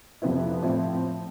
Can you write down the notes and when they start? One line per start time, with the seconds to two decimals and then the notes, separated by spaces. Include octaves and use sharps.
0.22 F2 C3 F3 B3 E4
0.62 A2 F3 C4 E4